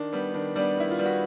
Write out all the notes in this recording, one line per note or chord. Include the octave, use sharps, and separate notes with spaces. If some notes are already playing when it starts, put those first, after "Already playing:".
Already playing: D#3 D4
G3 B3
D#3 D4
G3 B3 D4
D#3 E4
F4
G3 B3
F#4